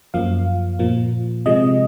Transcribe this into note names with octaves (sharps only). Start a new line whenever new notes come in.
F#2 F3 A#3 F5
A#2 F3 A#3
C3 F3 G#3 D#5